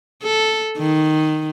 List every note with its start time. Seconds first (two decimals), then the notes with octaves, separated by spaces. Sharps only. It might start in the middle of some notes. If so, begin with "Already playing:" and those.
0.23 A4
0.78 D#3